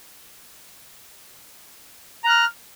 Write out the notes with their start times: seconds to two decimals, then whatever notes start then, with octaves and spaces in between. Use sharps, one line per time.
2.24 A#5
2.27 F#6
2.29 F6